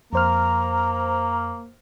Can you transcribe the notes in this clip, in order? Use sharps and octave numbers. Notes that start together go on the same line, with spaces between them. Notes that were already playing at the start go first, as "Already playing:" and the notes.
F2 A#3 C5 A#5 F6